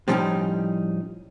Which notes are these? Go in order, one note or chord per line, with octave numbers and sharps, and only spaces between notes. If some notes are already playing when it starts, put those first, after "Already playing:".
A2 F3 G3 B3 C#4 D#4